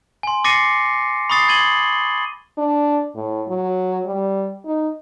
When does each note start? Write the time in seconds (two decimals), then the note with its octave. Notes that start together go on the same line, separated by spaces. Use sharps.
0.23 G#5 C6
0.44 D6 A6 A#6 C7 C#7 D#7
1.30 B5 C#6 D#6 A6 C7
1.48 D#6 G#6 A6 D#7 F#7 G7
2.57 D4
3.15 A2
3.48 F#3
4.06 G3
4.65 D#4